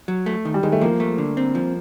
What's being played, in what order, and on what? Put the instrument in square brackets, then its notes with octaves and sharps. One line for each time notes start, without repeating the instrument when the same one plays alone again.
[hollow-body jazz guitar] F#3
A3
D#3
[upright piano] G3
[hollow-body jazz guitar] D#3 [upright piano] G#3
[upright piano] A3
[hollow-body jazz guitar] F3 [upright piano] A#3
[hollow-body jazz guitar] A3
D3
C4
F3